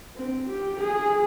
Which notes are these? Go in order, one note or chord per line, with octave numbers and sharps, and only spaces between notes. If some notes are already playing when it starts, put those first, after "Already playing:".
C4
G4
G#4